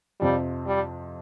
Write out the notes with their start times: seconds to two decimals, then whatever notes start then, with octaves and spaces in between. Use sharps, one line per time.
0.20 F2 C3 F3 G3 C4
0.67 G3